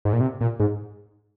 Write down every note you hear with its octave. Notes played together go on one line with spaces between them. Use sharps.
G#2
A#2
C3
A#2
G#2